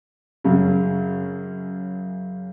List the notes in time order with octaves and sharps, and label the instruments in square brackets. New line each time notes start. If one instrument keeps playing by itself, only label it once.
[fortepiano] F#2 C#3